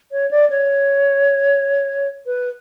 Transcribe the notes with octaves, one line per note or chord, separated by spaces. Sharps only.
C#5
D5
C#5
B4